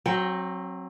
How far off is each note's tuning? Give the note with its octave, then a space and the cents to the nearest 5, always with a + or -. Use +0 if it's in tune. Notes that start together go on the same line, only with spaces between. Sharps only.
F#3 +0 C4 +30 G5 +0